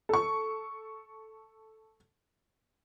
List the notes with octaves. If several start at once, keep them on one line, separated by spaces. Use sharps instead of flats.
A4 C#6